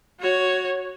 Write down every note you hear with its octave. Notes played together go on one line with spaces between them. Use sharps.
F#4 C#5